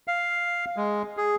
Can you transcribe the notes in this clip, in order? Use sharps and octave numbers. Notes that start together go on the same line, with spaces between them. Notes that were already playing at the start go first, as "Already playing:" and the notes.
F5
G#3
G#4